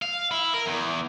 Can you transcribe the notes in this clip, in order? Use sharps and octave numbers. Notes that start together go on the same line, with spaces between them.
F5
E4
A#4
E2